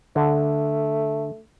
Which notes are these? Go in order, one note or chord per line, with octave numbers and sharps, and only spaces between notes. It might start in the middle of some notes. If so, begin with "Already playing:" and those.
D3 A3